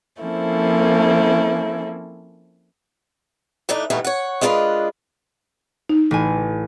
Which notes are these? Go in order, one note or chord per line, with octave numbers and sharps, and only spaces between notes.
F3 A#3 C4 C#4 E4 A4
E3 A3 D4 D#4
G2 B2 E3 A3 B3 D#4
C#5 F#5
G#3 D4 F4 A#4 B4 D#5
D#4
A1 G#5